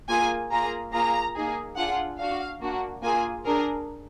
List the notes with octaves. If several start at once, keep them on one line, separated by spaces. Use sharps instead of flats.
A#3 F4 G#4 G#5
A#3 F4 G#4 A#5
A#3 F4 G#4 A#5
A#3 D#4 G#4
D4 F4 G#4 F#5
D4 F#4 F5
A#3 D4 F#4
A#3 F4 G#4 G#5
D4 G#4 A#4